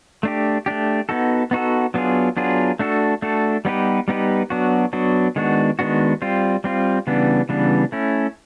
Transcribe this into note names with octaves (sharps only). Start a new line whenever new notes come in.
A3 D4 G4
A3 D4 G4
B3 D#4 F#4 A4
B3 D#4 F#4 A4
F#3 B3 D4 F4 G#4
F#3 B3 D4 F4 G#4
A3 D4 F#4 A4
A3 D4 F#4 A4
G3 B3 D#4 G4 B4
G3 B3 D#4 G4 B4
F#3 B3 D4 F#4
F#3 B3 D4 F#4
D#3 G#3 B3 D4 F#4
D#3 G#3 B3 D4 F#4
G3 C4 F4
G3 C4 F4
C#3 E3 G3 B3 D4
C#3 E3 G3 B3 D4
A3 C#4 E4